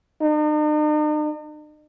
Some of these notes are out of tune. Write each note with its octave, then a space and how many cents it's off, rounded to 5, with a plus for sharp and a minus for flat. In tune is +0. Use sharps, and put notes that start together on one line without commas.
D#4 -45